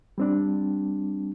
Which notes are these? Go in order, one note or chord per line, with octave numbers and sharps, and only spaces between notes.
G3 C4 D4